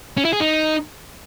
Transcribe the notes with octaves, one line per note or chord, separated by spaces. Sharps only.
C#4
E4
G#4
D#4